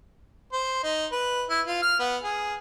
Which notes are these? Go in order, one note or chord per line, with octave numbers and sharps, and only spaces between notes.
C5
D#4
B4
E4
F4
F6
B3
G#4